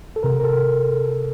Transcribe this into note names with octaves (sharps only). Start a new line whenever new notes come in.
A4
C3 A#4
A#4
A4